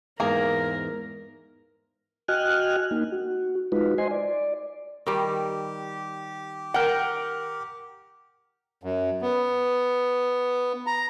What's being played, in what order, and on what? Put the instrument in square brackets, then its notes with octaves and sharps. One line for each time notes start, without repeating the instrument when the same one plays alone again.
[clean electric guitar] E2 G#2 [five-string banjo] A#3 G#4 [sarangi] A#4
[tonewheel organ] F#4 D#5 G5 G#5 F6 F#6
A#3 D#4
F#4
G#3 D#4 F4 F#4 B4
C5 D#5 G#5 C6
D5
[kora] D#3 G3 [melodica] G4
[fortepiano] A#4 F#5 [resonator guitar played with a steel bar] G5
[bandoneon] F#2
B3
A#5